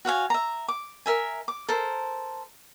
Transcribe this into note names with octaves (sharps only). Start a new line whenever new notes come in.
F#4 C#5 F5 G#5
E5 A#5
D6
A#4 E5 G#5
D6
A4 A#4 C5